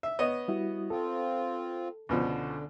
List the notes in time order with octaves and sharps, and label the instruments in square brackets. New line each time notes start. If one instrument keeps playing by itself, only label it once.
[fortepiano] E5
B3 C#5 D#5
[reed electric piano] G3 E4 F#4
[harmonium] C4 F4 [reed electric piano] A4
[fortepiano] C#2 B2 F3 [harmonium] D3